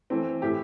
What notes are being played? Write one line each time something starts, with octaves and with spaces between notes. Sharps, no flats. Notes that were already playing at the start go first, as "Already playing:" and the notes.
E3 A3 C4
A2 E3 A3 E4 G4